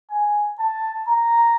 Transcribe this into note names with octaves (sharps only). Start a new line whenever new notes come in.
G#5
A5
A#5